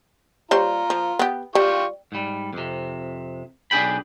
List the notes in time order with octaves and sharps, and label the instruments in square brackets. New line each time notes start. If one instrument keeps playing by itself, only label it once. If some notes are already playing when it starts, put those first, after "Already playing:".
[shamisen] G3 C5 C#5 [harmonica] F4 A#5
[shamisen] F3
B3 G4
[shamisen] G3 [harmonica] F4 G4 C#6
[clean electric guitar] G#2 G3
F2 C3
B1 D4 G#4 G5 B5